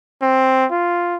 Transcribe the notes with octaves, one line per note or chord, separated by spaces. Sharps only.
C4
F4